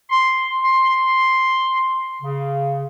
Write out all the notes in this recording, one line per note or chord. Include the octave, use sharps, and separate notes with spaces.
C6
C6
C#3